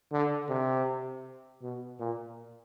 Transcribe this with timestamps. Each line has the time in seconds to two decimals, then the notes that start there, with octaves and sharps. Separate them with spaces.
0.12 D3
0.49 C3
1.62 B2
1.99 A#2